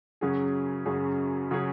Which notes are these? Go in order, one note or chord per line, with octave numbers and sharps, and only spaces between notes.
F#2 C#3 F#3 C#4 G#4
F#2 C#3 F#3 C#4 G#4
C#3 F#3 C#4 G#4